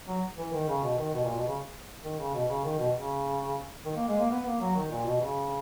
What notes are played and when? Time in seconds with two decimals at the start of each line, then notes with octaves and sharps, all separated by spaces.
0.08 F#3
0.38 E3
0.53 D#3
0.69 C#3
0.83 B2
0.98 D#3
1.14 B2
1.25 A#2
1.36 B2
1.48 C#3
2.04 D#3
2.19 C#3
2.34 B2
2.50 C#3
2.65 D#3
2.79 B2
2.95 C#3
3.86 D#3
3.96 A#3
4.08 G#3
4.19 A#3
4.31 B3
4.46 A#3
4.61 F#3
4.76 D#3
4.91 A#2
5.06 B2
5.21 C#3